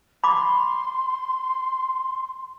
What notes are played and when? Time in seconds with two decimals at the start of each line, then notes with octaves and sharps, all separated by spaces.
0.24 B5 C6 D6